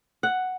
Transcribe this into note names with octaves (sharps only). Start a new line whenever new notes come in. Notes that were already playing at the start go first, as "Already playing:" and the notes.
F#5